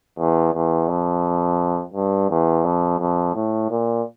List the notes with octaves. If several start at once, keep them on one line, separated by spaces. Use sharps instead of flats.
E2
E2
F2
G2
E2
F2
F2
A2
A#2